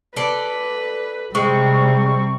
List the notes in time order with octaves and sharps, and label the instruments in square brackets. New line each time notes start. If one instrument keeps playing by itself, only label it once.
[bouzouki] A4 D5 [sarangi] B4
[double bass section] C3 G3 [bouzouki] G#3 [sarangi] C4 [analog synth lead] C#6